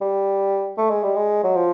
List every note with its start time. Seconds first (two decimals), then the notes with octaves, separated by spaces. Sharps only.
0.01 G3
0.78 A3
0.90 G#3
1.03 G3
1.16 G#3
1.44 F#3
1.56 F3